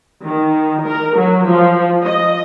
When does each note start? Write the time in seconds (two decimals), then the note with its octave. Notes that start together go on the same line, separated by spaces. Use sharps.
0.23 D#3
0.85 A#4
1.17 F#3
1.47 F3
2.05 D#5